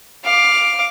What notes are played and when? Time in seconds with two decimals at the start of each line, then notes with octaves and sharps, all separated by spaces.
0.25 F5 D6